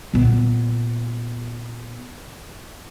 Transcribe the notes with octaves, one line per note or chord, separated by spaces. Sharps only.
A#2 B3